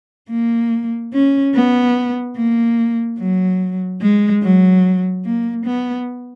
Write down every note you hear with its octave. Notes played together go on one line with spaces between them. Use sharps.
A#3
C#4
B3
A#3
F#3
G#3
F#3
A#3
B3